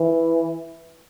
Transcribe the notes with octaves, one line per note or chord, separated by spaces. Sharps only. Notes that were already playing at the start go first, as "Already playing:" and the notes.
Already playing: E3